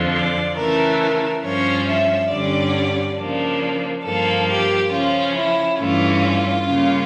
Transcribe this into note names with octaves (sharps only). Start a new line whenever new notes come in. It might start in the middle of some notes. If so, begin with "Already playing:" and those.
Already playing: F2 D3 F3
D5
C#3 E3 A3 A#4
A#4
G2 F3 C#4 C#5
E5
G2 D3 G3 C#4 D5
C#3 F3 A#3 D4
G2 F3 A#3 A4
G4
C#3 F3 C#4 F4
E4
G2 E3 A3 C#4 F4
C#3 G3 A#3 C#4